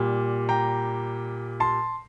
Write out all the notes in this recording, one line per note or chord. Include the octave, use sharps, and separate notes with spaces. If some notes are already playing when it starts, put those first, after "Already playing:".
Already playing: A#2 G3
G5 A#5
A5 C6